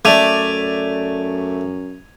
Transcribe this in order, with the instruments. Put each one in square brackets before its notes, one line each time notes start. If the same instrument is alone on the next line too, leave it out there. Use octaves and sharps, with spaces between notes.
[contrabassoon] F#2 [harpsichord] A3 [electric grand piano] D5 E5 D6 [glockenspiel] G#6 D#7 F7